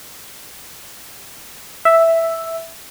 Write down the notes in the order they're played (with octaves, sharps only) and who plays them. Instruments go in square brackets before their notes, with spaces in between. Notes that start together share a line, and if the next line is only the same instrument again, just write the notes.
[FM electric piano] E5